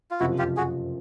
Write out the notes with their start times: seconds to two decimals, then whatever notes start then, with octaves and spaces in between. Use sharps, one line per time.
0.11 F4
0.20 F#1 F2 C3 F3 E4 F#4
0.38 F4 G4
0.57 F#4 G#4